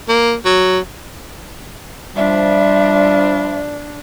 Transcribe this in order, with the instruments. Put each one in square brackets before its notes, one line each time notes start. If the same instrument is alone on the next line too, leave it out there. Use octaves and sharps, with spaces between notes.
[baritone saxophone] A#3
F#3
[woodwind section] F3 G3 [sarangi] D4 [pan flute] E5